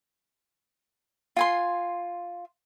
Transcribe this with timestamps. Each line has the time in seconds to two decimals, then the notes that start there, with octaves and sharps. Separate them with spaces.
1.36 F4 G#5 C6